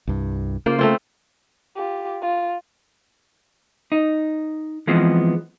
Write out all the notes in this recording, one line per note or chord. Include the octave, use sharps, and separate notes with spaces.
C2 G2
C#3 A#3 F4 C5
A3 C4 F4
F4 G4
F4
D#4
E3 F3 G#3 B3 C4